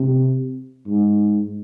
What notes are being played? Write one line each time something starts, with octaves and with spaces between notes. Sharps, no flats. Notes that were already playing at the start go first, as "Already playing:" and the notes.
Already playing: C3
G#2